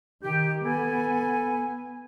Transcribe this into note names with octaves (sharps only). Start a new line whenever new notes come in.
D#3 G4
B3 A4 G#5